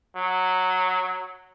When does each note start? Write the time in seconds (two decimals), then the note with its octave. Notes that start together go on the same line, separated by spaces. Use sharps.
0.16 F#3